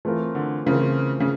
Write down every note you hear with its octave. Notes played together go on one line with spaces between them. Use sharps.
E3 A3 C4 F4 A#4
D3
C#3 E3 A3 C4 F4 A#4
C#3